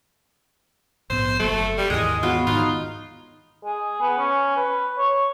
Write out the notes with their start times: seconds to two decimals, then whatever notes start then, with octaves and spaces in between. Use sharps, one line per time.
1.10 A#1 G#2 B3 C5
1.39 F#1 F#3 A3 A#3
1.78 G3
1.90 D#2 G#2 E3 G#3 G#4 A#4 D#5
2.23 B3 F4 F#4 C#5
2.47 G#2 D#3 E3 D#4 F4
3.65 G#4
4.02 B3
4.18 C#4
4.57 B4
4.98 C#5